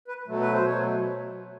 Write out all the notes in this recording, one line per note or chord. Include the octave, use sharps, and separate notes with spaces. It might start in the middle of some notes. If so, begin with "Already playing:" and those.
B4
B2 F#3 A3
B4
C5
B2 F#3 A3 C#5